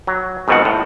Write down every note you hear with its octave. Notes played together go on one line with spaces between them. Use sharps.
F#3
G#2 B2 D#3 F3 C4 F#5
A2